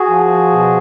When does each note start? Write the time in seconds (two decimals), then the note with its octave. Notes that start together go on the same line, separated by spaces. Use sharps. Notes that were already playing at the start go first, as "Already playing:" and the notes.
Already playing: F#4 G#4
0.08 F3
0.51 B2